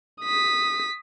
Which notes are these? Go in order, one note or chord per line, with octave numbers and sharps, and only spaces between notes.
D#6 B6